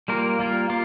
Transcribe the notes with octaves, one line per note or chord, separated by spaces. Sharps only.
G3 A#3 F4 A#4
G3 A#3 F4 A#4
A#3 F4